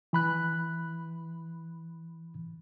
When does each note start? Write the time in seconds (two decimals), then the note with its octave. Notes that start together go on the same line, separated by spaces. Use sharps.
0.13 E3 B5 F#6